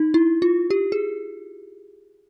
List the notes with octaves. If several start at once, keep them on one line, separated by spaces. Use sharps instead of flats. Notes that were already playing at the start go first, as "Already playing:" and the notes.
Already playing: D#4
E4
F4
G4
G#4